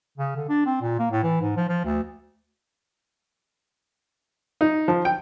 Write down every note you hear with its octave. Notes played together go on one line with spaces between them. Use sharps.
C#3
D3
D4
C4
A#2
A#3
A2
E3
G#2
F3
F3
D2
D#4
F3
G5